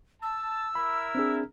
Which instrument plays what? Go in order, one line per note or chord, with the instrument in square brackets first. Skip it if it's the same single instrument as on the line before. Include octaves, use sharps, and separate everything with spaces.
[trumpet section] A5 [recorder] E6
[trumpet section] E4 A#4 E5 [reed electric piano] B5
[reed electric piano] C4 D4 G#4